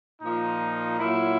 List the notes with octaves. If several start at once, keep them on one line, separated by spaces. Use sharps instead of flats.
A#2 F3 D#4
A#2 F#3 E4